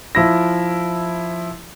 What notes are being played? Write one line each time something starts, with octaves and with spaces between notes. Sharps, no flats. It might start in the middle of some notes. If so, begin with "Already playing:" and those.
F3 E4 A#6